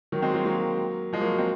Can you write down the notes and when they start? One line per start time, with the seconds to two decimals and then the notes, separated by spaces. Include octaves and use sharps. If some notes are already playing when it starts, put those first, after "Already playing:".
0.12 D#3 F#3
0.22 G#3 C4
0.34 F#3 A#3
0.45 F#3 A#3
1.13 F3 G#3
1.21 F#3 A#3
1.38 G#3 C4